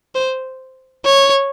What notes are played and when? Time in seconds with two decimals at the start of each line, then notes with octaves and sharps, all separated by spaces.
0.15 C5
1.05 C#5